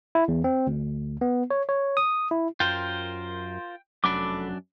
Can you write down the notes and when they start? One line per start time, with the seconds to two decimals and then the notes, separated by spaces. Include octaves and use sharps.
0.15 E4
0.28 E2
0.44 C4
0.67 D2
1.21 B3
1.51 C#5
1.69 C#5
1.97 D#6
2.31 E4
2.60 F#2 F4 A#4 C5 G5
4.04 F1 F#2 F#3 D4 A4 B5 D6